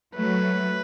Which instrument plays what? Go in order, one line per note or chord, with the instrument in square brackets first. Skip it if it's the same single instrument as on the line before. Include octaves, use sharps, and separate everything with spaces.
[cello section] F#3 A3 [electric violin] B4